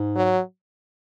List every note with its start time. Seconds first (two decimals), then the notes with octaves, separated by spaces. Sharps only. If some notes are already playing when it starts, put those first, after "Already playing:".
Already playing: G#2
0.16 F#3